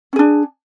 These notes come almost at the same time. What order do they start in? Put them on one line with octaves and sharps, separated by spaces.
C#4 G#4 D4